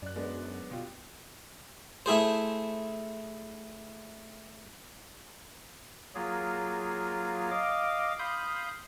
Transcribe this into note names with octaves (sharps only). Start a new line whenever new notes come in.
F#2 D5 F#6
G#3 B3 D4
B2 F4 G4
A3 E4 G#4 C5
F#3 A#3 F4 G#4
D#5 F5 D6
F5 B5 C6 D#6 G6